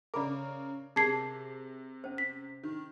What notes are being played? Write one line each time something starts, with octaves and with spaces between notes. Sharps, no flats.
C#3 A#4 D5 B5 D6
C3 G#4 A#4 A5 G#6 C7
C#4 C5
B6
D#3